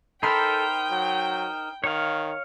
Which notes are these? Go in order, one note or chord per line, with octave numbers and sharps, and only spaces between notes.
D#4 A4 A#4 C5 G5 B5 C6
F#3
D#3 C#5 F5